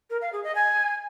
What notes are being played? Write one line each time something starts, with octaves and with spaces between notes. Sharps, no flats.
A#4
F5
G#4
D#5
G#5